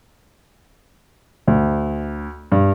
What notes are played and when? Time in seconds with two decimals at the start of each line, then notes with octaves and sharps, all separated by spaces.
1.48 D2
2.52 G2